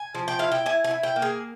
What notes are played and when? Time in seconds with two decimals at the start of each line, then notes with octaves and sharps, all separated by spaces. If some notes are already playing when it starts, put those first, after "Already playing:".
Already playing: G#5
0.15 F3
0.28 G5
0.39 E4 F5
0.52 G5
0.66 E4 G#5
0.84 G#5
0.91 E4
1.03 G5
1.16 A#3
1.22 G#4